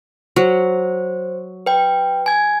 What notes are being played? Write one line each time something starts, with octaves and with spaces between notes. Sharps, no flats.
F#3 C5
B4 G5
G#5 G#6